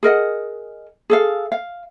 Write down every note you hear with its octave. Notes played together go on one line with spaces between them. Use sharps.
G#4 A#4 D#5 F#5
G#4 A4 F5
F5